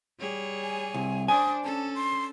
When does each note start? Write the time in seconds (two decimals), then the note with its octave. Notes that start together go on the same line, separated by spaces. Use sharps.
0.19 G3 G#4 C#5
0.63 G#5
0.94 C2
1.28 D4 C5 D5 G#5 D#6
1.63 C#4 A4 A5
1.95 C6